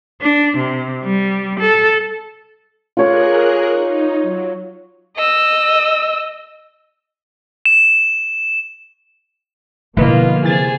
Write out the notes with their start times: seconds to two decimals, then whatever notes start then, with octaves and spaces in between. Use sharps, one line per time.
0.21 D4
0.57 C3
1.04 G3
1.60 A4
2.97 F4 G#4 A#4 C#5 D6 F#6
3.69 D#4
4.22 F#3
5.16 D#5 E6
7.66 E7
9.97 B2 D3 F3 A#3 E4 F4 B4 D#5
10.44 C3 E3 G#4 A6